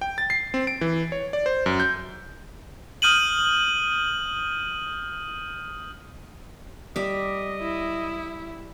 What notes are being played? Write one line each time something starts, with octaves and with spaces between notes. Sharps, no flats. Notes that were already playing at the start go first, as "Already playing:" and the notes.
G5
A6
C7
C4
D7
E3
C#5
D5
C5
F#2
G6
D#6 F6 G6 D#7 F#7
G3 D#5 E5
E4